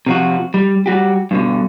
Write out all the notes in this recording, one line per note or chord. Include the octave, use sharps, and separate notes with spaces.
C3 F3 F#4
G3
G3 F#4 G4
G2 B2 D3